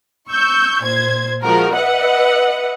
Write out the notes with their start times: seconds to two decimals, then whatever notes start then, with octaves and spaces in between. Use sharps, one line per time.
0.30 C#6 E6 G6
0.83 A#2 C5 G#6
1.44 F3 G#3 F#4 A#4
1.74 B4 D#5 E5 F#5